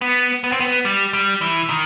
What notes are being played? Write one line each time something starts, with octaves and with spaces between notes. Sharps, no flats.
B3
B3
C4
B3
G3
G3
E3
D#3